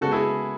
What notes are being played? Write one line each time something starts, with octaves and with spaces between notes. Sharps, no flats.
C#3 G#3 B3 F#4 A4
E4 G#4